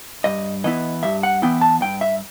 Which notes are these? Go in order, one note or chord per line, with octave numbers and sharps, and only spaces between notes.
G2 D#5
E3 B3 E4 D#5
G2 E5
F#5
E3 B3 E4 G5
A5
G2 G5
E5